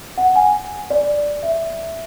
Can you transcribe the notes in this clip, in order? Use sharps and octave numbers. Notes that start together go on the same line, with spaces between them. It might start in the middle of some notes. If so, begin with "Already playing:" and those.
F#5
G#5
D5
E5